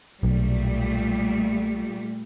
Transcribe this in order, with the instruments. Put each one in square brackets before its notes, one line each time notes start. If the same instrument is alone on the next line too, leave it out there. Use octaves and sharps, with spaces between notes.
[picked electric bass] B1 [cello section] A#2 G3 A3